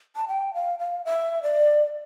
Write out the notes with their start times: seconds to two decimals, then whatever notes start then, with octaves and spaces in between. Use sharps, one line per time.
0.16 A5
0.28 G5
0.54 F5
0.79 F5
1.05 E5
1.43 D5